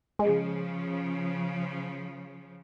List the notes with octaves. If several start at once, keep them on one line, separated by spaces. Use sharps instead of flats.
C#3 F3 G#3